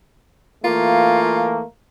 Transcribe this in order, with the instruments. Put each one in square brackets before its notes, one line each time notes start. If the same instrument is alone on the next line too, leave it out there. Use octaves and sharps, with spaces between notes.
[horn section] E3 A3 A#3 [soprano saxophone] F4